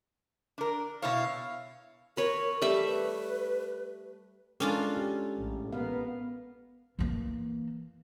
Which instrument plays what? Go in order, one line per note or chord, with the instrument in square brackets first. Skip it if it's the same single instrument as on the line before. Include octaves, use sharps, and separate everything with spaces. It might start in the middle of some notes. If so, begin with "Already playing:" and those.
[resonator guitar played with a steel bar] D4 A#4
[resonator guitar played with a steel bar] B2 E4 C#5 [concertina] F5
[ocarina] A#4 [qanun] B4 C#5
[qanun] G3 A3 E5
[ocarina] B4
[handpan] G#3 A4 A#4 [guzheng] C#4 D4 F4
[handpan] G4
[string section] A1
[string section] B3 [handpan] A#4 F5
[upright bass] E3 A#3